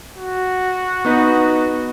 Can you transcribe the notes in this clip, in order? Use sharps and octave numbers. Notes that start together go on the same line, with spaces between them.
F#4
B3 D#4 B4